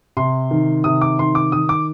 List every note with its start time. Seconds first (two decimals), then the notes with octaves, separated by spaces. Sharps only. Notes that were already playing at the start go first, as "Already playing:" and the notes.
0.17 C3 C6
0.51 D#3
0.84 C3 D#6
1.01 D6
1.19 D#3 C6
1.35 D6
1.52 D#3 D#6
1.69 D6